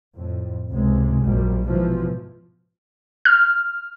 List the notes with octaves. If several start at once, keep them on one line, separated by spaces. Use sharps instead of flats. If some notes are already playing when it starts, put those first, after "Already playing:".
F2 A2
C#2 G#2 C3 G#3
A#1 F#2 A#2 G3
G#2 B2 E3 F3
F6